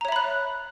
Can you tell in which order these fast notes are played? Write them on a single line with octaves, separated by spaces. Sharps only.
A#5 C#5 E5 B5 F#6